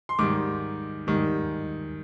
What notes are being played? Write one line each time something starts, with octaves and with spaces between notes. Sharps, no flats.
C6
G#2 D#3 G3 D6
G#2 D#3 G3